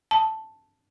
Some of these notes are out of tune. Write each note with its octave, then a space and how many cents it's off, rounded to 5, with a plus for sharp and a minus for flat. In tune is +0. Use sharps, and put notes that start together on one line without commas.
A5 +0